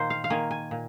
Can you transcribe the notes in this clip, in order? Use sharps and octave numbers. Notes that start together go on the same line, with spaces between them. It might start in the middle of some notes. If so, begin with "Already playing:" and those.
Already playing: A#2 D#3 A#3 C5
F5
F5
D#3 A#3 G#5
G#5
A#2